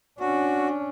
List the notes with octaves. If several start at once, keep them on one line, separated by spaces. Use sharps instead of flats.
C#4 D4 F#4